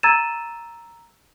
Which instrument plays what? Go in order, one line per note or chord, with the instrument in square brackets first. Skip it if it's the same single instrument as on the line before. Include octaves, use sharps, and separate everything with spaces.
[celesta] A#5 E6 G#6 A6 D#7 E7